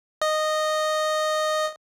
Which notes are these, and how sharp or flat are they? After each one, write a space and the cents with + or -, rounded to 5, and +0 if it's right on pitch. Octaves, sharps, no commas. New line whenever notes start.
D#5 -10